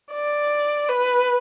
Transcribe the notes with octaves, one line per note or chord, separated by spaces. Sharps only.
D5
B4